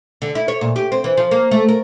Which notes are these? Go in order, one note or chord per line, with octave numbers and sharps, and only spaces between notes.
D3
E4
C#5
A#2
G4
C4
E3
F3
A#3
A3
A#4